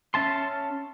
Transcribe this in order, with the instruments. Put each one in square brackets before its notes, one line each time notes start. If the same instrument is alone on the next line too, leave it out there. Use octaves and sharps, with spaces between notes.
[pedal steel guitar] C#4 E5 A5 C6